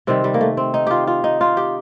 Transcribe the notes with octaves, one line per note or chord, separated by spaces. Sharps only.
C3 D#3 G3 C4
G3
A#3
A3
C4
D#4
F4 G4
F4
D#4
F4
G4